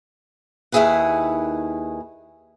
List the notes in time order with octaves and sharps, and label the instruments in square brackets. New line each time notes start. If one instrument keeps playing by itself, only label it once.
[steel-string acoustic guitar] D#2 D#3 E4 G#4 B4 F#5